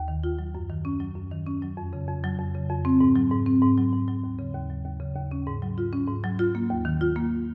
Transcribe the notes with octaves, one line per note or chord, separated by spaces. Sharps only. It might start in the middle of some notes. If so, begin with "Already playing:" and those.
Already playing: D#2
D#3
F4
F#3
F#2
D#3
C#4
F#3
F#2
D#3
C#4
F#3
F2
C#3
F2
F#3
F2
C#3
F2
C4
G#2
F#3
G#2
C4
G#2
F#3
G#2
F#3
D#2
C#3
D#2
F#3
D#2
C#3
D#2
C#4
G#2
F#3
F4
C#4
G#2
F#3
F4
A#3
D#2
D#3
F4
A#3